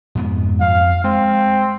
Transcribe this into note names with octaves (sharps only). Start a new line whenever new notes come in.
F2 G#2 B3
F2 F5
G#3 C4